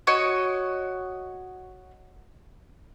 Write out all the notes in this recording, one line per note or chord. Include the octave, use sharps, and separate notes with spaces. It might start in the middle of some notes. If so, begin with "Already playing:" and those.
F#4 C#5 D#5